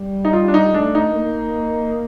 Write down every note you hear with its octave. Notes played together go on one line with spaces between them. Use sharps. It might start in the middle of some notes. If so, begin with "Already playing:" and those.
Already playing: G3
D#4
F4
D4
D#4
A3 D4
D#4
A#3